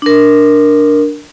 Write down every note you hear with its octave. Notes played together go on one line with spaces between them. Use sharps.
D4 A#4